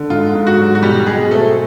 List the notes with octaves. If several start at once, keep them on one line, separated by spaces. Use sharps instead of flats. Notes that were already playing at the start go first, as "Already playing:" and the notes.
Already playing: D3
G#2 F4
G#2
F#4
F#3
F#4
B2 G3 G4
B2 G#3 G#4
A3 C4 A4